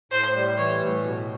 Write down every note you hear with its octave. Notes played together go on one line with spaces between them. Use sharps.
A2 C5
G3
E3 C#5
A2
B2